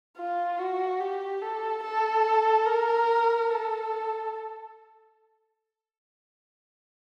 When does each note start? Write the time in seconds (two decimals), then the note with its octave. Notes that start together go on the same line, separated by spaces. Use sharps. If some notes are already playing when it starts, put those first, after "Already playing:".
0.17 F4
0.59 F#4
1.00 G4
1.42 A4
1.83 A4
2.66 A#4
3.50 A4